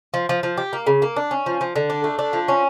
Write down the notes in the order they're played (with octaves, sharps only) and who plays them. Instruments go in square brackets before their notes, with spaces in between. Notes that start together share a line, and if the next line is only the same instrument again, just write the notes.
[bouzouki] F3
F3
F3
G4
A#3
C#3
A#3
D4
C#4
F3
F3
D3
D4
A3
D4
F3
C#4